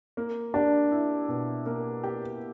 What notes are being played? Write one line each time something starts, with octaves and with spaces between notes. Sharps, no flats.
A#3
D4 G4
E4
B2
A#3
G4